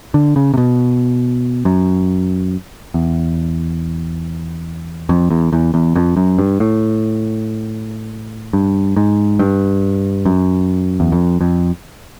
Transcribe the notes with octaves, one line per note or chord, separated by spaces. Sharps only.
D3
C#3
C3
B2
F#2
E2
F2
E2
E2
E2
F2
F#2
G2
A2
G2
G#2
G2
F#2
E2
F2
F2